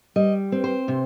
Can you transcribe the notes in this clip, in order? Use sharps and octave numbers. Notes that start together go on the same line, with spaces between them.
G3 D#5
C4
C5
C3